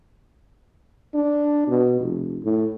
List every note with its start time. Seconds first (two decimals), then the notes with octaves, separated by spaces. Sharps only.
1.14 D4
1.68 B2
2.00 F1
2.43 A2